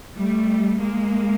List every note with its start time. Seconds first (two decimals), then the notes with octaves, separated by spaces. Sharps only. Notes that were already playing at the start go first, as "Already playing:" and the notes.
0.16 G3 A3
0.80 G#3 A#3